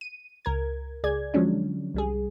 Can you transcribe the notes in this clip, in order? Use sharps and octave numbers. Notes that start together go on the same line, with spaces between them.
D#7
C#2 A#4 G#6
C#2 G#4 D5 G#6
D3 F3 F#3 G#3 C#4 D4
C2 G3 G#4